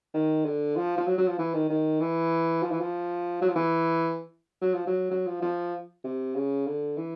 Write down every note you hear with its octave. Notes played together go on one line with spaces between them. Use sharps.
D#3
D3
F3
F3
F#3
F#3
F3
E3
D#3
D#3
E3
F3
E3
F3
F#3
F3
E3
F#3
F3
F#3
F#3
F3
F3
C3
C#3
D3
E3